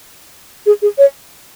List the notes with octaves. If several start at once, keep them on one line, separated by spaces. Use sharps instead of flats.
G#4
G#4
C#5